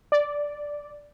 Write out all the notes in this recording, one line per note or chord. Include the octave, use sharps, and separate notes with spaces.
D5